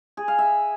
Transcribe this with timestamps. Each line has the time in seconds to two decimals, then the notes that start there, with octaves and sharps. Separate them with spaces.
0.17 G#4
0.28 F5
0.38 E5